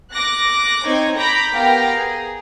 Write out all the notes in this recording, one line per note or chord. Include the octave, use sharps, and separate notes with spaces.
D6 F#6 A#6
C4 D#4 C#5 G#6
A#5 B5 D6 G6 A#6 B6
B3 G4 A#4 F5 G5 A#5
G#4